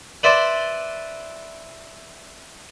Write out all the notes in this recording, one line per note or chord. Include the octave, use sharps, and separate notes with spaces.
B4 C5 D5 E5 C6